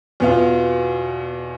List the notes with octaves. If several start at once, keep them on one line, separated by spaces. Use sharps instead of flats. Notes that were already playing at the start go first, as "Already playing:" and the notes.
E2 B2 B3 F4